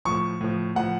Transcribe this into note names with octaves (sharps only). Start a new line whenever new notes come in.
A2 F3 C#6
A2 F3
A2 F3 F#5